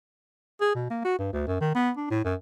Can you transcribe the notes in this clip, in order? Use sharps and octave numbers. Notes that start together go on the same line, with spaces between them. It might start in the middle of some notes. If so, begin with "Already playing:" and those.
G#4
B2
A#3
F#4
G2
D2
F#2
D#3
B3
D4
A2
F#2